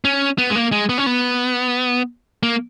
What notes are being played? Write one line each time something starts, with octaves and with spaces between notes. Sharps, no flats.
C#4
B3
G#3
A#3
G#3
B3
C#4
B3
A#3